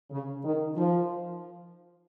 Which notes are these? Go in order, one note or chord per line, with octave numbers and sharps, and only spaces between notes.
C#3
D#3
F3